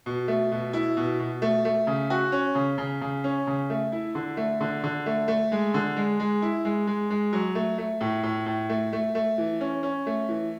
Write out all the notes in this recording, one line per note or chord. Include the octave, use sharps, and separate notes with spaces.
B2
A3
B2
E4
B2
B2
A3
A3
C#3
F#4
C#4
C#3
C#3
C#3
C#4
C#3
A3
E4
D3
A3
D3
D3
A3
A3
G#3
D3
G#3
G#3
E4
G#3
G#3
G#3
F#3
A3
A3
A2
A2
A2
A3
A3
A3
E3
C#4
C#4
A3
E3